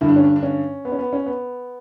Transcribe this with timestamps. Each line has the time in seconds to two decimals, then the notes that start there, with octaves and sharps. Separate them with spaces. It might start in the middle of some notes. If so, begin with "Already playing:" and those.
0.01 G2 D3 E4
0.08 D4
0.16 C#4
0.24 D4
0.36 D4
0.43 C#4
0.85 B3
0.92 C#4
0.99 B3
1.13 C#4
1.26 B3